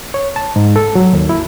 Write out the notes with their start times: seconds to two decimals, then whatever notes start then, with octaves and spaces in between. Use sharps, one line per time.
0.14 C#5
0.36 A5
0.56 G#2
0.76 A4
0.95 F#3
1.13 D#2
1.29 E4